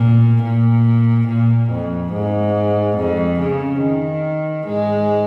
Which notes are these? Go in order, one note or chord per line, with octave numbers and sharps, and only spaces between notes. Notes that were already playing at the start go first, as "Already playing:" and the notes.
Already playing: A#2
A#2
A#2
F2
G#2
F2
C#3
D#3
G#2 G#3